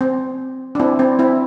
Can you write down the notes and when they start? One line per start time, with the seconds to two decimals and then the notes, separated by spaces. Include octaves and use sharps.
0.01 C4
0.75 D4
0.80 C4 E4
0.99 C4
1.19 C4 E4